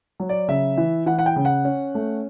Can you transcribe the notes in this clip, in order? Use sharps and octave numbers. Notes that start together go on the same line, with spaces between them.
F#3
D5
C#3 E5
E3
E3 F#5
F#5
G5
C#3
F#5
C#4
A3